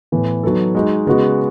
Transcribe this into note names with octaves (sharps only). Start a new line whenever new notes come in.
A2 E3 B3
F#3 B3 D#4 A4
G#3 D#4 F#4
C#3 G#3 B3 F#4